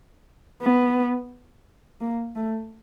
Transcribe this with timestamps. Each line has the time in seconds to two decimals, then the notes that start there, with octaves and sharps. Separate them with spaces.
0.62 B3
2.01 A#3
2.36 A3